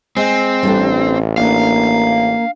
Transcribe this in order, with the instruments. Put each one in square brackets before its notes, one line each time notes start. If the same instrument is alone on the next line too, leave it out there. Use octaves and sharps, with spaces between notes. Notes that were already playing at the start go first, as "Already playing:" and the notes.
[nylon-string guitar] G#3 [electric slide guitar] C4
[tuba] A1 [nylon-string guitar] G3 D4 A4
[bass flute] A#3 [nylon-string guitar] D4 [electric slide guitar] F5